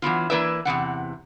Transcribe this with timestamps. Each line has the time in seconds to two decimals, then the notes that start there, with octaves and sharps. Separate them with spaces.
0.02 E3 F#3 B3 F4
0.30 E3 A#3 E4 B4 D5 E5
0.65 E2 C3 E3 F#5